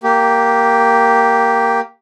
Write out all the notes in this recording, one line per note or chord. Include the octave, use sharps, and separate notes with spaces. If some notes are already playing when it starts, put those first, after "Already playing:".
A#3 G4